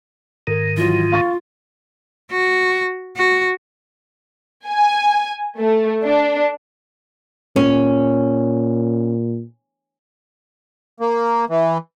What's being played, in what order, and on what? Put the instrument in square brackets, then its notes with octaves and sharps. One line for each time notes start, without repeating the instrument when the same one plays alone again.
[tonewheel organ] G#2 D#3 [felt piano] A#4
[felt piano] E3 F#3 [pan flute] F4
[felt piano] F5 C#6 A6
[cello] F#4
F#4
[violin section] G#5
A3
D4
[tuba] A#2 [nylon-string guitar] C#4
[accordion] A#3
E3